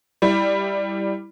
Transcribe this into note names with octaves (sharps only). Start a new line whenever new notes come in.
G3 E4